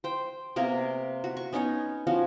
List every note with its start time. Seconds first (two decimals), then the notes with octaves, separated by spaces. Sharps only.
0.04 C5 G5
0.56 C3 A#3 B3 A#4
1.24 F#4
1.37 C#6
1.53 B3 C#4 D#4 C#5
2.07 F3 C#4 F#4